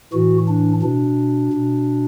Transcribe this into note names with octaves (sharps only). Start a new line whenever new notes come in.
A2 E3 F#4
D4
B2 D4
B2